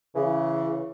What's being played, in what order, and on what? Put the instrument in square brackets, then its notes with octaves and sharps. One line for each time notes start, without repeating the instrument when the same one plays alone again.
[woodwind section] C#3 E3